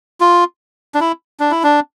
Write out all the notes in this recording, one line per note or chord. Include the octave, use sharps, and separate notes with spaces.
F4
D4
E4
D4
E4
D4